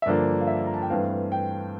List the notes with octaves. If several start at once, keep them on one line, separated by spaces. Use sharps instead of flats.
E5
G2 D3 F3 A#3 D5
F5
E5
A#5
A5
G5
G2 E3 A3 C4 F5
G5